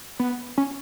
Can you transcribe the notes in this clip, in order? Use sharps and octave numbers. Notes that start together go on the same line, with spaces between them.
B3
C#4